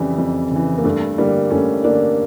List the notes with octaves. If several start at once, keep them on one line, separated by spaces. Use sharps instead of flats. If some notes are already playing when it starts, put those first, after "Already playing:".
Already playing: F2 C#3 E3 G3
F2
C#3 E3
A#3
G2 A3
D3 G3 A#3
G2 A3 C#4
D3 A#3 D4